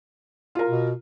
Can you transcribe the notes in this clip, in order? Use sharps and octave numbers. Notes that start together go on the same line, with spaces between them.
F4 A#4
B2